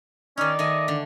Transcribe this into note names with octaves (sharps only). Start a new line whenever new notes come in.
D#3 C#4 D#4 D5
D#3 A3 D#5 G#5
D3